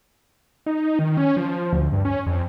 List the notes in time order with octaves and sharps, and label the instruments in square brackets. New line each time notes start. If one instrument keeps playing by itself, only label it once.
[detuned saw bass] D#4
D#3
C#4
F3
D2
G2
C#4
F2